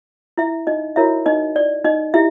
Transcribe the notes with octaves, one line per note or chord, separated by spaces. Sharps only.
E4 E5
D#4 D#5
E4 F#4 A#4 C#5 E5
D#4 D#5
D5
D#4 D#5
E4 G4 E5